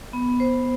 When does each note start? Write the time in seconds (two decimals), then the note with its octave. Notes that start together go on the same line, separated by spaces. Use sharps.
0.13 B3
0.40 C5